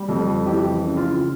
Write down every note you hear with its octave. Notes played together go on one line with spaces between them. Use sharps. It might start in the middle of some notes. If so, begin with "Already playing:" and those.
Already playing: G3
F2
E3 G4
C#3
F4